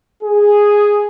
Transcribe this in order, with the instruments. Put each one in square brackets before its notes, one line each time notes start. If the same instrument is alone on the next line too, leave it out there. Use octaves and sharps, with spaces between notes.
[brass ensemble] G#4